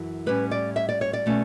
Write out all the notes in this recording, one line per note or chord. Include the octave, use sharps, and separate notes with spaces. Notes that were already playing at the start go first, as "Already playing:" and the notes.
Already playing: F#2 E3
A2 G3 C#4 B4
D5
E5
D5
C#5
D5
B2 A3 C#4